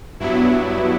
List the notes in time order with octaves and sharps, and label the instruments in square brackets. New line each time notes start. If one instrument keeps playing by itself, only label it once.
[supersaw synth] G2 F#3 B3 E4